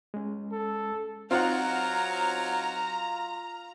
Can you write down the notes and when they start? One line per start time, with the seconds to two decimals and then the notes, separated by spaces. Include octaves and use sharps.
0.14 G#3 C#4
0.52 A4
1.31 F#3 C4 D#4 F4 F#5 A#5